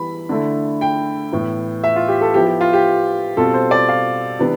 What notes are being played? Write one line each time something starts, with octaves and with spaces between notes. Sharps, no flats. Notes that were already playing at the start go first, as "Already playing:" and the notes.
Already playing: E3 G3 B3 B5
D3 A3 E4
G5
A2 E3 B3 E4
E5
F4
G4
A4
F3 B3 E4 G4
G4
F4
G4
B2 G3 C4 F4 A4
C5
D5
F5
C3 E3 B3 D4